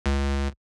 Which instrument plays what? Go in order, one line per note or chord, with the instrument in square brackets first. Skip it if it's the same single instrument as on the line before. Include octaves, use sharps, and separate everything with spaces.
[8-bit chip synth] C#2